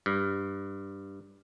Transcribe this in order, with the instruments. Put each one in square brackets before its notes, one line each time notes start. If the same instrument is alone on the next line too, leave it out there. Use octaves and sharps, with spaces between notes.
[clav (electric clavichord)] G2